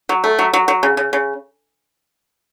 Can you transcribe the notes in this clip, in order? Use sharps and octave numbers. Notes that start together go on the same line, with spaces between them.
F#3
A3
F#3
F#3
F#3
C#3
C#3
C#3